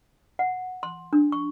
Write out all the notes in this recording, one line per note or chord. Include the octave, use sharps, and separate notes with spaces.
F#5
C6
D4
C#6